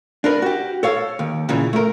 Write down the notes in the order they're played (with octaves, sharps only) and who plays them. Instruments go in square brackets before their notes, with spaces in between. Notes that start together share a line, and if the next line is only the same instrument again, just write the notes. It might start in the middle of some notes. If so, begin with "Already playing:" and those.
[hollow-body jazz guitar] D4 A#4 B4
F#4 G4
A4 C#5 F5
D#2
A#2 C#3 E3
A3 A#4